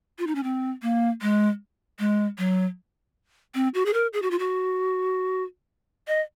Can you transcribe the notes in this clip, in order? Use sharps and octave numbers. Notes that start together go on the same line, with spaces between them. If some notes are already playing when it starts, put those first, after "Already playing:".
F4
D#4
C#4
C4
A#3
G#3
G#3
F#3
C4
F#4
G#4
A#4
G#4
F#4
F4
F#4
D#5